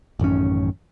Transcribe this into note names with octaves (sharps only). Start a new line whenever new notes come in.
A1 F#2 D#3 C#4